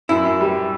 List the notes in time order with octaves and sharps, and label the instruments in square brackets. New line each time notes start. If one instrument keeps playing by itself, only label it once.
[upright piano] F#2 [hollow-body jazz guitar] E4
[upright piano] F#2
G3